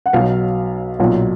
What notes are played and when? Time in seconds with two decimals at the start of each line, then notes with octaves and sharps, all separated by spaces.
0.06 F#5
0.13 B1 B2 F#3 F5
1.00 B1 A#2 F#3